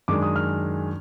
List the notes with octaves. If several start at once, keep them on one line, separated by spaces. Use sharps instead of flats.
F#2 D#3 G#3 D4 D6
D#6
F6